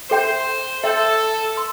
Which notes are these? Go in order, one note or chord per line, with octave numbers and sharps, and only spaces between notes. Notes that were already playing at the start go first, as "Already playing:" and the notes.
A4 C5 E5 G5 C6 G6
A4 E5 G5 C6 G6
C6 E6